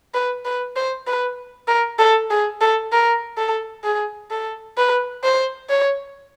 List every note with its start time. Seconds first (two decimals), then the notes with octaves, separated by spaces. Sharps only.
0.14 B4
0.45 B4
0.76 C5
1.07 B4
1.68 A#4
1.99 A4
2.30 G#4
2.61 A4
2.92 A#4
3.38 A4
3.84 G#4
4.31 A4
4.77 B4
5.24 C5
5.70 C#5